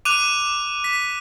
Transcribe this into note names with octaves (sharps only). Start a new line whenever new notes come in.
D6 F#6 D#7 F7
B6